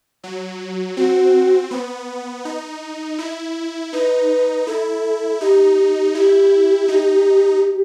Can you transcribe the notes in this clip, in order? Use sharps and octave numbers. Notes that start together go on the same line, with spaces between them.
F#3
C4 F#4
B3
D#4
E4
D#4 B4
E4 A4
D#4 G4
E4 G4
D#4